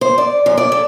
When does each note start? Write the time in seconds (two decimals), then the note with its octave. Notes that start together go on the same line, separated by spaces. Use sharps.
0.01 C5
0.18 D5
0.46 F#2
0.58 D5
0.72 A4